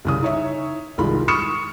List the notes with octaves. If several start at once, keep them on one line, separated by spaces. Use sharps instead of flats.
C2 C#3 D#6
D#4 C#5 E5
C2 D#3 G#3 F4 B5
B5 C#6 D#6 F6 C#7 E7